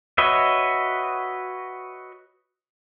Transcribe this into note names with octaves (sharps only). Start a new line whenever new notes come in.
F#4 B4 C#5 D#5 E5